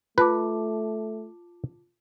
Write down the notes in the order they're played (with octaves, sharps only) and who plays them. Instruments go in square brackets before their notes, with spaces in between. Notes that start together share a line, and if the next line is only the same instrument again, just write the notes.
[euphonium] A3 [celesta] F4 A5 D6 [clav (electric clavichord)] B4